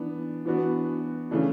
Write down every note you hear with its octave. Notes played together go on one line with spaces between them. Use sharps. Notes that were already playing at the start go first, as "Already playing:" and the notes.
Already playing: E3 B3 D4
E3 B3 D4 F#4
C#3 E3 A3 D4